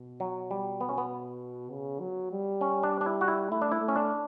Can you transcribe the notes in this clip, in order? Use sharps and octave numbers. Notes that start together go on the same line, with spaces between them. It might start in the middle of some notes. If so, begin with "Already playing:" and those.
Already playing: B2
F#3
G3
B3
C#4
B3
C#3
F#3
G3
C#4
D4
D4
E4
F#4
E4
A3 E4
D4
E4
A3
C#4
D4